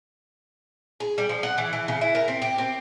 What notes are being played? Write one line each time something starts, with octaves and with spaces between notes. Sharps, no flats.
G#4
G3
F3
F#5
E3
E3
C#3
E4
A#4
C4
G4
C4